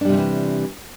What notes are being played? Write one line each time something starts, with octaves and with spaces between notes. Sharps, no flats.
C3 E3 F3 G3 D4